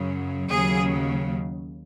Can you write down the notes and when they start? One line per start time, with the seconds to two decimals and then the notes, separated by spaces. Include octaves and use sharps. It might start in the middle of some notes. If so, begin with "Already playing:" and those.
Already playing: F#2 C#3 F#3
0.50 D#2 C#3 F#3 G#4